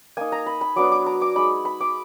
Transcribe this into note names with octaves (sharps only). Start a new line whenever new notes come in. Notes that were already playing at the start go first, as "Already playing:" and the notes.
A#3 D#4 G#5
A#5
B5
B5
F#3 B3 D4 D6
D6
A#5
D6
G#3 D#4 B5
B5
D6